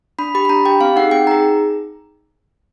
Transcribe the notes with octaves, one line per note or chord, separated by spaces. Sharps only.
D4 B5
G4 B5
B5
D4 A#5
G4 G5
C4 F5
D#4 G#4 F#5
C4 G5
D#4 G#4 A#5